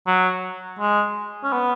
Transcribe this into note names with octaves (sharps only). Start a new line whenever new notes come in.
F#3
G#3
C#4
B3